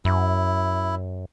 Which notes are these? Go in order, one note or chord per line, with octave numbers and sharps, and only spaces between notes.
F#2 E4